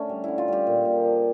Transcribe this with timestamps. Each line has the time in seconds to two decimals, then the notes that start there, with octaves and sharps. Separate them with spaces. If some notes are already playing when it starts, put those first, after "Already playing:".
Already playing: D3 A3 C#4
0.09 G3
0.24 D3 E4
0.38 F4
0.48 G3 G4
0.67 A#2
0.85 A#2
1.05 F3